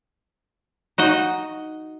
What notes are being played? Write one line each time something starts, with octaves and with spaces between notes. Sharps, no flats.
D#4 F#4 D#5